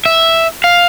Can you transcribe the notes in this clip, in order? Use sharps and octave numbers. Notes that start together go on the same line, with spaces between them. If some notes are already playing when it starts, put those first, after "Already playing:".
E5
F5